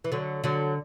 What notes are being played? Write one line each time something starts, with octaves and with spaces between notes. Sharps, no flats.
E3
D3 F#3
D3 F#3